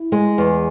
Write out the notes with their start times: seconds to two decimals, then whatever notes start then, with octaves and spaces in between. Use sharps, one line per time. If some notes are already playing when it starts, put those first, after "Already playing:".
Already playing: E4
0.12 G#3
0.38 E2